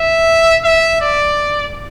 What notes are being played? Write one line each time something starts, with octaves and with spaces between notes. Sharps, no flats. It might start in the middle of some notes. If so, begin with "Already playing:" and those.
Already playing: E5
E5
D5